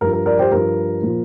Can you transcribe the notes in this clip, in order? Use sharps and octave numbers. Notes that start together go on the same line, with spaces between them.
G2 F3 A#4
A#4
A#4 D5
G4 C5
G2 F3 A#4
A#2 F3